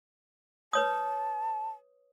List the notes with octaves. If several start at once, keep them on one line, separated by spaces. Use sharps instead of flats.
B4 C#5 A5 D#6